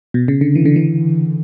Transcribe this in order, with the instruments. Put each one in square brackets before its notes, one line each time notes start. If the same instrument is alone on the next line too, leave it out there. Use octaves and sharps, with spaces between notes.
[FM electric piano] B2
C#3
D3
E3
D3
E3